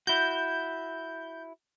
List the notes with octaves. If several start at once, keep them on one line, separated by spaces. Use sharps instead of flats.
E4 F#4 G6